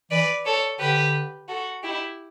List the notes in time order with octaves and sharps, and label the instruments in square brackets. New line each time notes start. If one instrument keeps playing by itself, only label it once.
[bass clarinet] E3 [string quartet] B4 D5
[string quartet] A4 C#5
[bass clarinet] D3 [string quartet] G4 B4
[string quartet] F#4 A4
E4 G4